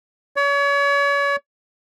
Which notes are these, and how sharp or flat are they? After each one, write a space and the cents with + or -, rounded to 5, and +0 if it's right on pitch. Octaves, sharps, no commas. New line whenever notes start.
C#5 +35